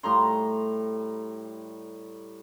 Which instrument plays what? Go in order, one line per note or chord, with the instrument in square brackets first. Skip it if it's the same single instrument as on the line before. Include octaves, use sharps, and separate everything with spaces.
[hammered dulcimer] A2 G3 A#5 C6